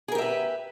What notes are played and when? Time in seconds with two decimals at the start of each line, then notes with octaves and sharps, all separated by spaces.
0.08 G#4
0.12 A#4
0.15 G4
0.18 E5
0.22 B4